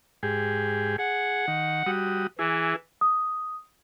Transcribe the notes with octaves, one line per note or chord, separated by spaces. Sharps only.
G#2 G4 G#4
G#4 F#5
D#3
G3 F#4 D#6
E3 E4 G#4
D#6